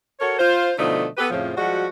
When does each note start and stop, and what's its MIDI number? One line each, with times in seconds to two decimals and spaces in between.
0.20 0.39 66
0.20 0.39 69
0.20 0.39 70
0.20 0.39 73
0.39 0.72 65
0.39 0.72 72
0.78 1.06 47
0.78 1.06 50
0.78 1.06 53
0.78 1.06 57
0.78 1.06 63
0.78 1.06 75
1.18 1.27 59
1.18 1.27 67
1.18 1.27 69
1.18 1.27 71
1.30 1.52 41
1.30 1.52 45
1.30 1.52 49
1.30 1.52 53
1.57 1.87 53
1.57 1.87 55
1.57 1.87 56
1.57 1.87 66